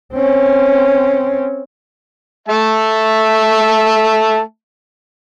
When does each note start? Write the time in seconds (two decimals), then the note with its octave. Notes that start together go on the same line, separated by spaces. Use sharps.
0.13 C4 C#4
2.48 A3 E5 A5